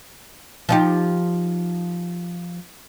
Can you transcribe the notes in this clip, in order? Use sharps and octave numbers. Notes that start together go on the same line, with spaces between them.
F3 D#4 G4